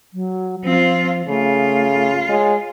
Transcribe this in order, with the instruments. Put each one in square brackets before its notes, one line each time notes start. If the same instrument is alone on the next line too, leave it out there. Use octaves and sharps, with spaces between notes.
[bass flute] F#3
[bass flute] F3 [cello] C4 F4
[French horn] C#3 [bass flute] A3 [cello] F4
[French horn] G#3 [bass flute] C#5